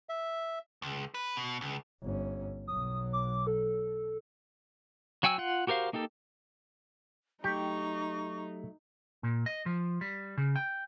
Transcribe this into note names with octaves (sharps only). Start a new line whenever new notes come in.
E5
C#2
B4
B2
C#2
G1 C#4
B1 F#3 D#6
D6
A4
F#3 F#4 G5 G#5 E6
F4 F#5
F#4 G4 A#4 C5 F5
A#3 D#4 G4 A4
F#3 A3 D#4 G4 G5 C#6
A#2
D#5
F3
G3
C#3
G5